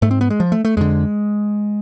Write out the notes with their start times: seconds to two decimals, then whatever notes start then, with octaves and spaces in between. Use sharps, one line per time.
0.02 G#2 A3
0.11 C4
0.21 B3
0.30 G#3
0.40 F3
0.52 A3
0.65 A3
0.77 F2 D3 G#3